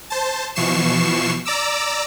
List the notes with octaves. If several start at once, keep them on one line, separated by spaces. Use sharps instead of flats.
C5 A5
B2 E3 F3 C#6 C7 E7
D5 A#5 D6 E6